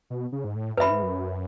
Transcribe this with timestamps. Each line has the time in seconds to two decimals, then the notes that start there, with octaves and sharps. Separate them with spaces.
0.10 B2
0.32 C#3
0.44 G#2
0.56 A2
0.77 F#2 B4 E5 B5
0.90 G#2
1.03 F#2